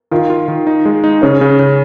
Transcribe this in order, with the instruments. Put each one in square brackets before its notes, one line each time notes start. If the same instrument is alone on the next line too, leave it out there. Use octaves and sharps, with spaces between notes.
[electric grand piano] D#3 [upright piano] F4
[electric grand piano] F4
D#3
D#4
G#3
D#4
[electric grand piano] C#3 [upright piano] C#4
[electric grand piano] C#3
C#3